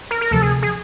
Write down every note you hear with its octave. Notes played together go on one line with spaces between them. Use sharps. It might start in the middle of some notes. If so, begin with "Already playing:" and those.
A#4
A#4
D2 C3 F3 A4
G#4
G#4